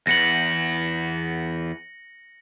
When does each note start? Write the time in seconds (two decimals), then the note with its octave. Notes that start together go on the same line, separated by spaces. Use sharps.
0.07 E2 B3 A#6 C#7 F#7